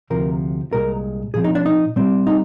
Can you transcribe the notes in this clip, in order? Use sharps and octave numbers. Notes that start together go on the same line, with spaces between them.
D2 C3 F3 A#4
C2 A#2 G#3 A#4
A#2 F3 C4 G#4
D#4
D4
D#4
A#2 G3 C4
D#4